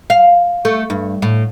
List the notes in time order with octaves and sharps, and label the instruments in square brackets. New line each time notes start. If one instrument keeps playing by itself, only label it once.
[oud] F5
A3
G2
A2